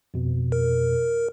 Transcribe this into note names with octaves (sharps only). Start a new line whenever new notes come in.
F2 B2
A#4